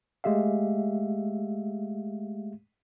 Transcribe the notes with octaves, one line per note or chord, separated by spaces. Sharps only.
G#3 A3 G4 E5 F5